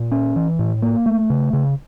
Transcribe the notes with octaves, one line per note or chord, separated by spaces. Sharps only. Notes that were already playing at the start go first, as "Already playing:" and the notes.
Already playing: A#2
C#4
E3
A2
A#3
A3
C#3
C#3